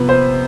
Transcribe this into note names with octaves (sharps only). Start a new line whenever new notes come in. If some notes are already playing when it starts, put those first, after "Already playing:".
Already playing: C3 F3 B3 B4
C5